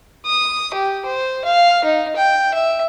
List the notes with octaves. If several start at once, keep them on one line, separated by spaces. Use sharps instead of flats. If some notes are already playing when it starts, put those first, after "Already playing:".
D#6
G4
C5
F5
D#4
G5
E5